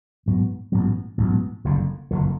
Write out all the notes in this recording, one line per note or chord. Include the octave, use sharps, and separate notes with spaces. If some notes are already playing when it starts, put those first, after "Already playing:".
A1 G#2 F#3 B3
A1 G#2 F#3 B3
A1 G#2 F#3 B3
F#1 F2 D3
F#1 F2 D3